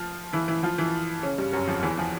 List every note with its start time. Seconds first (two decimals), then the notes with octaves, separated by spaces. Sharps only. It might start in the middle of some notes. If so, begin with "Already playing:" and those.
Already playing: F3 F4
0.33 E3 E4
0.48 E3 E4
0.63 F3 F4
0.78 E3 E4
1.23 C#3 C#4
1.38 G2 G3
1.53 F#2 F#3
1.67 F2 F3
1.83 E2 E3
1.98 F3